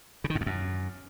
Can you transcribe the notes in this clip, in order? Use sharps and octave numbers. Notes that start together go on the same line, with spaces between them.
C#3
D#3
G#2
F2
F#2